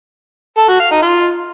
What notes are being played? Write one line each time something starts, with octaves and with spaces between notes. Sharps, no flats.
A4
F#4
F5
D#4
F4